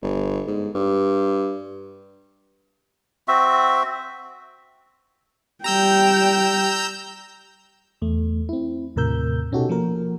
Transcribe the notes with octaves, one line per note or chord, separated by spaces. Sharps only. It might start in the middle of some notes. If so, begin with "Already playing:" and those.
G1
G#2
G2
C4 F#4 E5
G3 G5 A#5 E6 G6
E2 A3
C4 E4
D#2 A2 C3 A#4 E6 G6
B2 C#4 D#4 F#4 G4 A4
F3 A#3 A#4